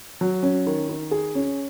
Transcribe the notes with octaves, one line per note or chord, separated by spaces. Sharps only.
F#3
C#4
D#3
D#3
G#4
C#4